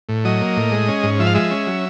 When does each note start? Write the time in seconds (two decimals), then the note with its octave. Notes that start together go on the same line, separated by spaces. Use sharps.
0.09 A2
0.25 F#3 D#5
0.41 A#3
0.57 A2
0.72 G#3
0.88 C#4
1.03 G#2
1.19 F3 E5
1.26 F5
1.34 G#3 E5
1.51 C#4
1.67 F#3